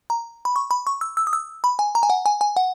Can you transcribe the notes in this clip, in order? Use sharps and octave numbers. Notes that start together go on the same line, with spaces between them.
A#5
B5
C#6
B5
C#6
E6
E6
D#6
E6
B5
G#5
A#5
G#5
F#5
G#5
G#5
F#5